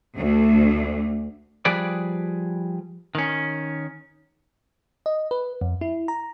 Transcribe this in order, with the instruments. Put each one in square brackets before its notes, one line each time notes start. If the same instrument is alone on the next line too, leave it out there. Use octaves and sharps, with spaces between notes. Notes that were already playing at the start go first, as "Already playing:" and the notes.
[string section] D2
[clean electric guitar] F3 G3 G#4 B4 D5
D#3 C#4
[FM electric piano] D#5
B4
F2
E4
A#5